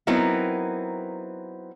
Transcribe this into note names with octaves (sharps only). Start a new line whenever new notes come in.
F#3 B3 C4 D#4 E4 A#4